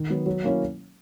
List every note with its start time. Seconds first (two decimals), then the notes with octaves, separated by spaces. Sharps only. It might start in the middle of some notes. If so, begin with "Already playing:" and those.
Already playing: D#3
0.10 F#3 B3
0.26 F#3
0.44 A#3 C#4 E4